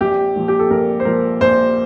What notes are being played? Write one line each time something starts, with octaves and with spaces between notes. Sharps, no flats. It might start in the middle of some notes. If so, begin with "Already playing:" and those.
A#1 G4
A#2 F3
G4
A4
A#1 A#4
C5
A#2 F3 A#4
A#1 C5